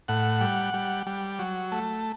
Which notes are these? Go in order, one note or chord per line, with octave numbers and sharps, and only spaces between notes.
A2 F#5
G3
G3
G3
F#3
A3